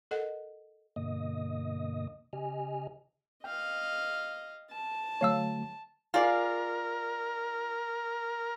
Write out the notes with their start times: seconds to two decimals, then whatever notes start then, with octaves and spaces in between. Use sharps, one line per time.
0.11 A4 A#4 D#5 F#5
0.96 G2 B2 D3 A#3 D#5 D#6
2.33 C#3 G4 D#5 G#5 F6
3.44 D#5 F5 G5
4.71 A5
5.21 D3 F#3 A3 C#5 F5 E6
6.14 F4 G#4 A#4 D5